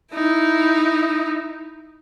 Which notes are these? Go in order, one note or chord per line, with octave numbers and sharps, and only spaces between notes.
D#4 E4